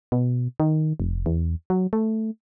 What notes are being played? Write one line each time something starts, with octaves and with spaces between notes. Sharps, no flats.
B2
D#3
F1
E2
F#3
A3